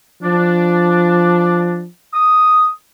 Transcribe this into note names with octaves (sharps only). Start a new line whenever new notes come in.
F3 D4
D#6